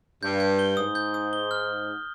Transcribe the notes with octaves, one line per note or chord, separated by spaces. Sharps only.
G2 G6
G6
G7
G#2 D#6
G6
D#6
G7
F6